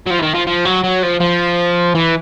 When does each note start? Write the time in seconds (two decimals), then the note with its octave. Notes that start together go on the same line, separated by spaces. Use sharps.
0.06 F#3
0.10 F3
0.19 E3
0.22 D#3
0.34 F3
0.47 F3
0.65 F#3
0.84 F#3
1.03 F3
1.21 F3
1.95 E3